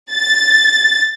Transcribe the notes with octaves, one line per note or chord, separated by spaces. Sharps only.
A6